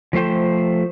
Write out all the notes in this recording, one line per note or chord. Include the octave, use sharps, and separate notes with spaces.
F3 A3 C5 G5